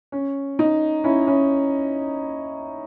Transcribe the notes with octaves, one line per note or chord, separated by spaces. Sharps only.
C#4
D#4
C#4 E4
C#4 E4